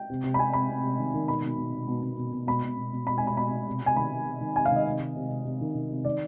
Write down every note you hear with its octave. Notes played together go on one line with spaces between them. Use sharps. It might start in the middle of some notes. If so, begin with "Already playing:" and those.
Already playing: G5
C3
C3
B5
C3 G#5
C3 B5
C3
C3
D#3
D#3
B2 B5
B2
B2
B2
B2
B2
B2
B2
B2 B5
B2
B2
B2
B2 B5
G#5
B2 B5
B2 B5
B2
C3
C3 G#5
D#3 B5
D#3
C3
D#3
C3 G#5
F5
D#3 D#5
C3
D#3
C3
C3
C3
D#3
D#3
C3
D#3 D5